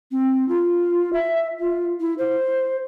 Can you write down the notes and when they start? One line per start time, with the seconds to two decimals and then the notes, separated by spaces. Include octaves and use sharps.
0.12 C4
0.49 F4
1.13 E5
1.60 F4
2.00 E4
2.18 C5